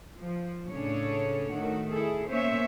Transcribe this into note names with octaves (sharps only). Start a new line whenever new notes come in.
F3
A2 C#3 C#4 D4 A4 C#5
D#3 A3 F#4
E4 G#4 A4
A#3 B3 C#4 C5 C#5 E5